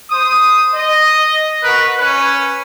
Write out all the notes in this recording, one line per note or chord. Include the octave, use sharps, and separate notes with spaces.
C5 D#6
D#5
F#4 A#4 B4
C#4 B4